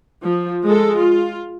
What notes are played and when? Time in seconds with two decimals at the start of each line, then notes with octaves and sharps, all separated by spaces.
0.21 F3
0.65 G#3 A4
0.95 F4